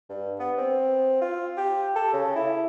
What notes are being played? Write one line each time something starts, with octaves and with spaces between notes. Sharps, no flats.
G2
B3
C4
F4
G4
A4
C#3
E4